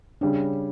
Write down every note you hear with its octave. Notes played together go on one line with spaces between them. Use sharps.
C#3 G3 C#4 D4